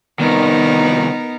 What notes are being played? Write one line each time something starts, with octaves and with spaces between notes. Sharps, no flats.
C2 D#3 B3 D#4 A#4